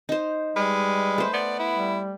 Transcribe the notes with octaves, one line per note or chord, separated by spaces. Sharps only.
D#4 C5
G3 G#3 B4
A3 C5
B3 D5
E4
G3